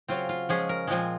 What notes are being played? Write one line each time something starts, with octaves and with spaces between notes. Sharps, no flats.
C#3 F#3 C4 F4
F4
F3 G#3 C#4 G#4
A#4
A#2 F3 G#3 C4 G#5